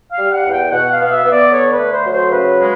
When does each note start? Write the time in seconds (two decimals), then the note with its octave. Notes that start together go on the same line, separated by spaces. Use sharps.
0.11 F5
0.18 G3
0.32 F#5
0.46 E2
0.52 G5
0.71 B2 F#5
0.92 F5
0.99 B3
1.12 E5
1.25 B3
1.32 D5
1.52 D3 C#5
1.71 B4
1.79 A3
1.93 C5
2.05 F#3
2.12 C5
2.32 C#3 B4
2.59 G#3